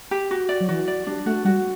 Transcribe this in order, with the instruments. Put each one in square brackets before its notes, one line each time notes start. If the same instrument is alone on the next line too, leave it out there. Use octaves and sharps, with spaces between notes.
[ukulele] G4
F#4
D5
[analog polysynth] F#3
[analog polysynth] E3 [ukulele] F#4
[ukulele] D5
[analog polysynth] G3 [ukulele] D4
[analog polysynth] A3 [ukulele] F#4
[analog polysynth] G3 [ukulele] F#4